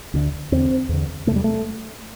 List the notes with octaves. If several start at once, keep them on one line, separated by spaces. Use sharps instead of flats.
D2 D3
E2 D3 C4
E2 D3
E2 C3 G3 A3
A3